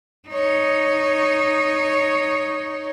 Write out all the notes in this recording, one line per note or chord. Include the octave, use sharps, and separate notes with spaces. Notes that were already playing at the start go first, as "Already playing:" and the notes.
D#4 C#5